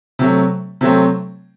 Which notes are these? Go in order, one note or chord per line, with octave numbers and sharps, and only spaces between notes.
C3 F#3 A3
C3 F#3 A3 C4